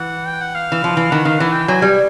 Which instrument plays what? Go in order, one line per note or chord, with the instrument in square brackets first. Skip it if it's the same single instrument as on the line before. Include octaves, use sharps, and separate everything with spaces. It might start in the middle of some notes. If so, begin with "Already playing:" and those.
Already playing: [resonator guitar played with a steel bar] E3 [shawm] F#5
[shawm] G5
F#5
F5
[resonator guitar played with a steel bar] E3
F3
E3
[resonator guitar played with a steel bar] D#3 [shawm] F#5
[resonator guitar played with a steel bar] D#3 [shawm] F5
[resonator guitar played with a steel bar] E3 [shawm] F#5
[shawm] G5
[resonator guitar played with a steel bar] F#3 [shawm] G#5
[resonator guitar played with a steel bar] G3